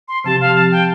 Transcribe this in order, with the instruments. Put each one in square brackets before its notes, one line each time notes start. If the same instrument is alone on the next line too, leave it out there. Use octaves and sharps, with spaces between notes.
[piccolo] C6
[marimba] C3 F3 C4 G4 [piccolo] A5
[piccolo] F5
A5
G5